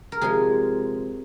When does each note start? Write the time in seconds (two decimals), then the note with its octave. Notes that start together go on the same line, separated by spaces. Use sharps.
0.12 A#4
0.21 C3 F3 G#3 G#4